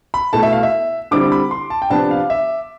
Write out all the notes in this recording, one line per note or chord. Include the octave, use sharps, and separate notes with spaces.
B5
B2 A3 E4 A5
E5
F5
E5
D3 G3 C4 E4 D6
B5
C6
A5
G5
C3 F3 B3 D4 A5
F5
E5